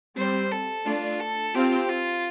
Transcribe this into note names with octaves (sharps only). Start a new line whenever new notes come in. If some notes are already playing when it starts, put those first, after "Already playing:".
G3 C4 C5
A4
A3 D4 F4
A4
C4 F4 G4
F4